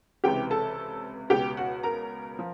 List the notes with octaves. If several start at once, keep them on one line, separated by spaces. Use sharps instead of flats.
C#2 C3 E3 G4 G5
A4 A5
C#2 B2 G4 G5
F#4 F#5
A#4 A#5
F3